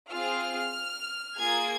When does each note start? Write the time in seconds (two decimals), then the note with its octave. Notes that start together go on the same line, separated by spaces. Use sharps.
0.12 C4 F4 G#4 F6
1.39 A#3 F4 G#4 G#6